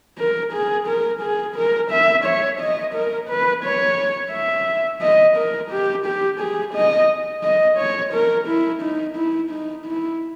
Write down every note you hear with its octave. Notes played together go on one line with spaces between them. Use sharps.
A#4
G#4
A#4
G#4
A#4
E5
C#5
D#5
A#4
B4
C#5
E5
D#5
A#4
G4
G4
G#4
D#5
D#5
C#5
A#4
E4
D#4
E4
D#4
E4